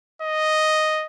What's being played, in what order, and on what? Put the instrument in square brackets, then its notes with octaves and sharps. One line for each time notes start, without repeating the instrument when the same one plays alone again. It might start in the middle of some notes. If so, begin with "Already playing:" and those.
[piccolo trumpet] D#5